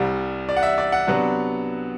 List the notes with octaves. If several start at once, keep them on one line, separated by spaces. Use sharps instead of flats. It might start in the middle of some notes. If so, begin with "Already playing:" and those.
Already playing: C2 C3 G3
D5
F#5
E5
D5
F#5
C3 F#3 B3 D4